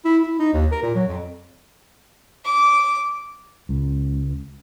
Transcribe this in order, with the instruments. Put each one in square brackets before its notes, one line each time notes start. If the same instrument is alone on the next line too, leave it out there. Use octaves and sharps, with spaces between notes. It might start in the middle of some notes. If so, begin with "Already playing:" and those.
[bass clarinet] E4
E4
D#4
D#2
A#4
A#2
F#3
F2
[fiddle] D6
[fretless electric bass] C#2